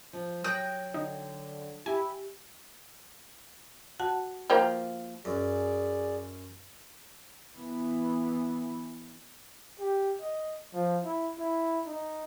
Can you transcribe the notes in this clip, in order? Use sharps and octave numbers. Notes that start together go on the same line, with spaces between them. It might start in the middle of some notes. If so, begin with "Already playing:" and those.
F3
F#3 G5 D#6 F#6 A#6
D3 D#4
E4 G4 G#5
F#4 F#5 A5
F3 A#3 G5
F#2 G#4 D5
E3 B3
G4
D#5
F3
E4
E4
D#4